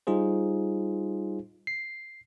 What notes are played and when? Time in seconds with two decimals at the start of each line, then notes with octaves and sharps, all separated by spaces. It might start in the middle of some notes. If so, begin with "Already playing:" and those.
0.07 G3 D#4 F4 G#4 C5
1.67 C7